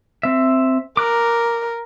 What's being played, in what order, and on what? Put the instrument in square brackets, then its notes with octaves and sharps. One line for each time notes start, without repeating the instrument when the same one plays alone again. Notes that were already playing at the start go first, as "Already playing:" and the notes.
[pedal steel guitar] C4 E5
[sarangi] A#4 [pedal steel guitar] D6 F#6